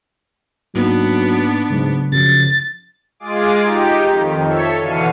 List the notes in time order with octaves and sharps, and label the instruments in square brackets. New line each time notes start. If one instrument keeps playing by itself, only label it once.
[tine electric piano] G#2 A#3 D#4 [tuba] F#3 [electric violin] B3 D4
[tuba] G#2 [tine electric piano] C#3 F#3 A3
[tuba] F#2 [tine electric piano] C#3 F3 [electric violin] A6
[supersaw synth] G#3 F4 G#4 D6
D#4 G4
F2 D#3
A4 C#5 E5
B2 D3 E3 F5 C#7 D#7